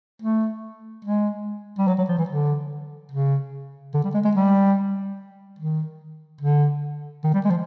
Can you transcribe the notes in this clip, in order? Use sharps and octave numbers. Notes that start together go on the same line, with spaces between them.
A3
G#3
G3
F#3
F#3
F3
E3
D3
C#3
D3
G3
G#3
G#3
G3
D#3
D3
D#3
G3
G#3
F3